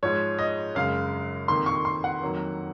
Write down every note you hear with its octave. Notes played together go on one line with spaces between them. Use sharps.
G#2 F3 G#3 C#5
D#5
F#2 C#3 G#3 F5
F2 D#3 A#3 C6
C#6
C6
F#5
F2 D#3 F#3 A#3